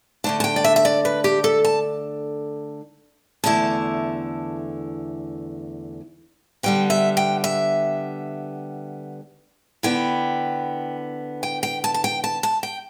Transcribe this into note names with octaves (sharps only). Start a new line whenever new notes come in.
D3 A3 D4 A5
A5
G5
D5
E5
E5
D5
B4
G4
A4
A5
E2 D3 A3 E4 A5
D3 G3 B3 G5
E5
G5
E5
D3 B3 E4 G5
G5
G5
A5
A5
G5
A5
A5
G5